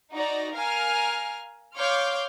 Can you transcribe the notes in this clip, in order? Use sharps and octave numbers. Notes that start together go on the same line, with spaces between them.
D#4 F#4 D5 A#5
A#4 F5 G#5 F6
C#5 F5 C6 D6 F6 G6